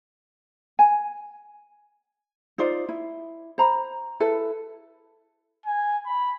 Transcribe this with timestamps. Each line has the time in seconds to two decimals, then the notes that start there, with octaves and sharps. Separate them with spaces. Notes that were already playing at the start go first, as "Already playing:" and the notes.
0.79 G#5
2.58 D#4 F4 C5 D5
2.89 E4
3.58 C5 A#5 B5
4.20 E4 A4 B4
5.66 G#5
6.06 B5